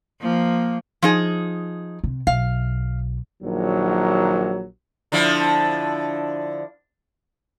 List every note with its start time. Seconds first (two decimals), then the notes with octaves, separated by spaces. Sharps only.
0.22 F3 A#3
1.02 F3 D#4 G#4
2.04 C3
2.27 B1 F5
3.41 A#1 D#3 F#3
5.12 D3 F3 E4